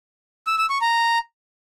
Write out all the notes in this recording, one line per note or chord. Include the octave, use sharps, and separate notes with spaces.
E6
E6
C#6
A#5